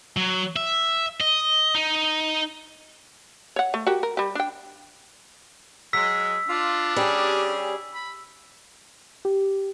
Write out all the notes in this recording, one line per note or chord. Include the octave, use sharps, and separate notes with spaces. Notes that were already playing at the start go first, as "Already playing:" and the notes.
F#3
E5
D#5
D#4
C#5 F#5
A3
F#4 G4 A#4
A#4
G3 G4
D4 G5
F#3 G#3 E6 B6
D4 F4
G3 C#4 G4 G#4
B5
G4